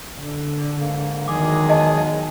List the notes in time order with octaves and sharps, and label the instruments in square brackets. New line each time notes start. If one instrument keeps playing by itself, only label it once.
[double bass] D3
[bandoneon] G#2 A#3
[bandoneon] E2 G#3 G#4 [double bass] D#3 F#3 [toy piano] D6
[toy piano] D#5 G5 A5